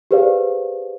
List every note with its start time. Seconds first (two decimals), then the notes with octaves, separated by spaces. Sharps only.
0.11 G4 G#4 B4 C5 D5 F5